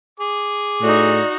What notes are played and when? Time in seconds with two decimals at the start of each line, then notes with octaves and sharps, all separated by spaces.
0.20 G#4 D6
0.82 A2 D#4 F#4 D5